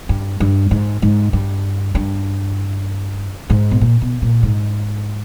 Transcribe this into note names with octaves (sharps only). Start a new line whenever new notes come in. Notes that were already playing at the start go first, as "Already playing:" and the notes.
G2
G2
G#2
G#2
G2
G2
G#2
B2
A#2
B2
A#2
G#2